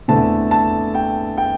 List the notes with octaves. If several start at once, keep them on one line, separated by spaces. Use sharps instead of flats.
E2 D3 A3 C4 A5
A5
G5
G5